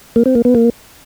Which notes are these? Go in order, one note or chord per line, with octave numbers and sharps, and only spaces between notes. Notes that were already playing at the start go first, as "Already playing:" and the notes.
A#3
C4
A#3
B3
A#3